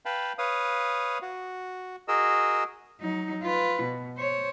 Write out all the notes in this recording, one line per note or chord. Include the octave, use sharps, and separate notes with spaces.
B4 F5 G5 A5 B5
B4 C#5 F5 D#6
F#4
F#4 G#4 A#4 D#5 E6
F#3 D#4
F4 B4
B2
C5 C#5